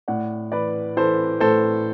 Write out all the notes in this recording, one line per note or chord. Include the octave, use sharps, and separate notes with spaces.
A2 D5 F#5
E3 B4 D5
E3 A4 C5
A2 A4 C5